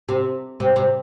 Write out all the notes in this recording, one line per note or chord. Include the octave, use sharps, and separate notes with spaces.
C3
C3
C3